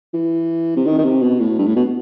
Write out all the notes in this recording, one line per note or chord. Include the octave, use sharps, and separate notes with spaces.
E3
C3
D#3
D#3
C3
B2
A2
G2
A2
B2